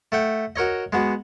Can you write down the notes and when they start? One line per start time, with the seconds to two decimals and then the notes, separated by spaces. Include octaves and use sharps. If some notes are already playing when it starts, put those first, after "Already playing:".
0.12 A3 F#5 G5
0.56 F#4 A#4 C#5 D#5
0.93 G#3 B3 F#4